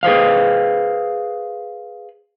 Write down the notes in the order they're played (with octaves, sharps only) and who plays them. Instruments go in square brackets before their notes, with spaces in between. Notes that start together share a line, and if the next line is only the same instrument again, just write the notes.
[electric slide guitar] G#4 B4 C5 F5